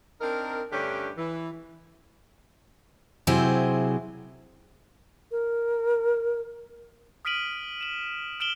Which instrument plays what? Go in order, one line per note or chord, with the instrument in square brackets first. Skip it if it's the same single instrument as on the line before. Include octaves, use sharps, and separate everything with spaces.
[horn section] C4 D4 D#4 A#4
G2 D3 A3 C#4 D4 G4
E3
[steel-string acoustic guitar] C3 F#3 C4 E4 G#4 C5
[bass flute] A#4
[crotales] D#6 F6 B6 D7 D#7 F#7
E7 F#7
F6 D7 E7 F#7 G7